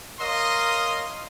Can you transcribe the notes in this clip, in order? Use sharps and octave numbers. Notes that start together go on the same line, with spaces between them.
A#4 C#5 D#5 F5 C6 D#6